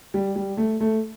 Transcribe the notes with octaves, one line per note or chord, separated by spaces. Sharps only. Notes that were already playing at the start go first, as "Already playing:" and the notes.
G3
G3
A3
A3